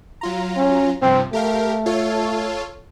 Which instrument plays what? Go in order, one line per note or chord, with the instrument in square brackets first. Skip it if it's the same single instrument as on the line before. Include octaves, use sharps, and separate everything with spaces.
[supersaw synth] F#3 F4 A#5
[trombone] C#4
[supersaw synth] G2 C3 F3 [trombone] C4
[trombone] A3 [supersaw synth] G4 A#4 F5
[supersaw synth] F4 A4 C#5